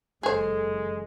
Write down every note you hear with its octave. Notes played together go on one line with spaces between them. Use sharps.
F#1 E3 G#3 G#4 A4 C5